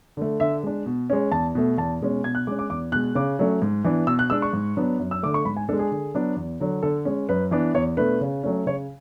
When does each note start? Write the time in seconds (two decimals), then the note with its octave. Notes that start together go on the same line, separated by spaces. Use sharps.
0.17 D3 A3
0.40 D3 E5
0.63 G#3 D4
0.86 B2
1.10 G#3 C#4
1.31 E2 A5
1.55 B2 A3
1.77 E2 A5
2.01 B2 G#3 C#4
2.24 B2 G#6
2.35 F#6
2.47 G#3 C#4 D6
2.59 D6
2.70 E2 D6
2.92 B2 F#6
2.96 G#3
3.15 C#3 D6
3.39 F#3 A3 C#4
3.62 G#2
3.85 E3 B3 D4
4.07 B2 E6
4.19 F#6
4.30 G#3 D4 E6
4.42 C#6
4.53 G#2
4.77 F#3 B3 D4
5.00 F#2
5.11 E6
5.23 D3 A3 D6
5.34 C#6
5.45 G#2 B5
5.57 G#5
5.69 G#3 D4 A4
5.79 G#4
5.92 D3
6.14 F#3 B3 D4
6.36 E2
6.60 D3 F#3
6.83 D3 A4
7.05 G#3 C#4
7.29 F#2 B4
7.51 E3 B3 D4
7.75 E2 C#5
7.97 B2 A3 D4 B4
8.21 C#3
8.43 F#3 A3 C#4
8.66 C#3 C#5